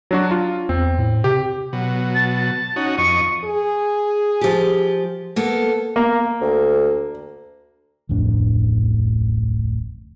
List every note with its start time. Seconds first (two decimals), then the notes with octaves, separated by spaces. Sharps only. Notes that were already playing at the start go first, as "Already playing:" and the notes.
0.11 F#3 D4 F#4
0.31 F4
0.69 E2 C4
0.98 A2
1.24 C3 G4
1.73 B2 F#3
2.15 A5
2.76 C#4 D#4 F#4
2.98 F2 D#5 C#6
3.44 G#4
4.41 F3 G4
5.36 A#3 B3 A4
5.96 A#3
6.41 D2
8.09 D1 A1 F2 D4